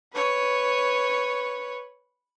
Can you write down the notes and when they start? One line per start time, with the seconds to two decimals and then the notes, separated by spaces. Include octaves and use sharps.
0.14 B4 C#5